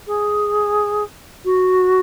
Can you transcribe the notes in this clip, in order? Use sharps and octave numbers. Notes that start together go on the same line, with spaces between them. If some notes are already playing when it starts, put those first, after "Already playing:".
G#4
F#4